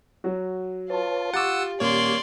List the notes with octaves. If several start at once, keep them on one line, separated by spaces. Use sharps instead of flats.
F#3 F#4
F4 B4 C#5 A5
G4 F#5 C#6 D6 E6 A6
D#1 A#3 C#5 D5 C6